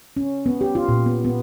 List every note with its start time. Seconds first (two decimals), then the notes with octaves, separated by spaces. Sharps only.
0.17 C#4
0.46 B3
0.61 G4
0.75 F4
0.89 A#2
1.06 B3
1.25 B3